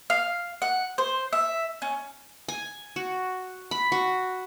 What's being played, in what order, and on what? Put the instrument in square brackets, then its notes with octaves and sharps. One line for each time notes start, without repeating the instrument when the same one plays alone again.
[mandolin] F5
F#5
C5
E5
C#4
[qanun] G#5
F#4
B5
F#4